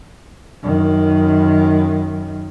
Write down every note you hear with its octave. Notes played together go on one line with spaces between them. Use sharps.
F#2 D#3